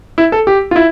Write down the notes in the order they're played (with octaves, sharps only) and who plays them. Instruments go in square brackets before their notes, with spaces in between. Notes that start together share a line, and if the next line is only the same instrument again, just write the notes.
[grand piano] E4
A4
G4
F4
E4